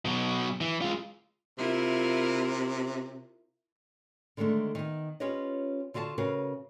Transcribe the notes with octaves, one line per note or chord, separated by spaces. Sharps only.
B2 F#3
E3
G#3 F4
C3 E4 F4 A#4
D3 D#3 G#3 A3 D4
D#3 B3
C#4 F4 G4 B4 C#5 D#5
D3 F4 F#4 D#5 A5
C#3 F#4 A#4 B4